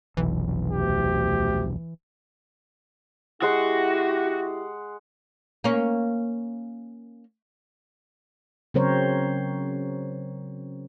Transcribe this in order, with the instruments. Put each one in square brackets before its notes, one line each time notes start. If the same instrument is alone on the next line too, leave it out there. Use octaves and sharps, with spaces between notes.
[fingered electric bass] F1 B1 [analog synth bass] E3
[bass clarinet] D2 [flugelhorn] G4
[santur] G#3 F#5 C6 [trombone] E4 [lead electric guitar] F#4 [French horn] G4
[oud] A#3 C#4
[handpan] C#3 F#3 C4 A#4 C5 C#5